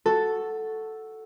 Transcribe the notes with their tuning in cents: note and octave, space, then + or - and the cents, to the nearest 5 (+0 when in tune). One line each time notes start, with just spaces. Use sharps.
F#4 +0 A4 +0